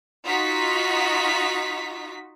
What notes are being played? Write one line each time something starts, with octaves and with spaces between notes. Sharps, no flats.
D#4 F4 F#4 B6